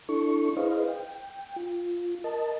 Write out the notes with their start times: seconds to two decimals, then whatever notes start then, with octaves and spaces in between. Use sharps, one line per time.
0.09 D4 E4 A4 C#6
0.57 E4 G#4 B4 C5 D#5 F5
0.88 G5
1.56 F4
2.24 A#4 D#5 A5